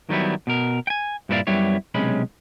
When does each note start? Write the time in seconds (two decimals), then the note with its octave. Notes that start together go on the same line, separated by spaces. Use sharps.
0.09 D#3 F#3 G3 B3 E4
0.47 B2 A#4
0.87 G5 G#5
1.29 G2 A#2 E4 C#5 D5 F5
1.47 F#2 G3 B3 E4 C#5
1.94 B1 C3 G#3 C#4 B5